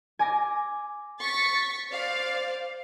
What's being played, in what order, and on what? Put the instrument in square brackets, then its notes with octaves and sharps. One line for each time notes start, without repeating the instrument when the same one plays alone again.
[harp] G#5 D6 A#6
[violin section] C#6 A6 B6
C5 D5 F5